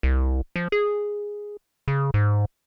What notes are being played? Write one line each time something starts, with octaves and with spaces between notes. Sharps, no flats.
C2
F3
G#4
C#3
G#2